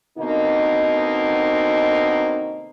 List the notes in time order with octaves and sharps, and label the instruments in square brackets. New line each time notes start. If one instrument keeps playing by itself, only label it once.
[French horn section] B2 D3 A#3 C4 D#4